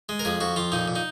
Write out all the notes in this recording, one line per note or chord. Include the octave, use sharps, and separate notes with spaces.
G#3
A#4
F2 G#4
F2 F#4
F2 F4
A#2 D#4
A#2
D#4